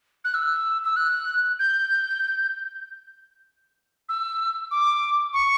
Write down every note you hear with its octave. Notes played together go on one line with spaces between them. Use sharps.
F#6
E6
E6
F#6
G6
E6
D6
C#6